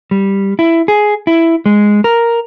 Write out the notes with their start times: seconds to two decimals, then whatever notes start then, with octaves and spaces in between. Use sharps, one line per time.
0.11 G3
0.59 E4
0.88 G#4
1.27 E4
1.66 G#3
2.04 A#4